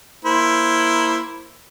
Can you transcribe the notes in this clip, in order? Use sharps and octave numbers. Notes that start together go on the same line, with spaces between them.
A#3 E4 C5